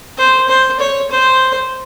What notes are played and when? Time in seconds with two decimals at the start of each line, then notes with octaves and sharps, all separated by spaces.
0.18 C5
0.49 C5
0.79 C#5
1.11 C5